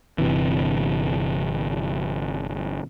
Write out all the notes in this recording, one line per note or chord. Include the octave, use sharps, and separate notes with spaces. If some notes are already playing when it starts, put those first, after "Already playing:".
G1 C3 E3